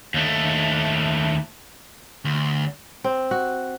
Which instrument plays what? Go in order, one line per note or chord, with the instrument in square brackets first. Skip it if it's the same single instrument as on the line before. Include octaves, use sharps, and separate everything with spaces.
[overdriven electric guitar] D#2 A3
[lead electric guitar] D2
[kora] C4
F#4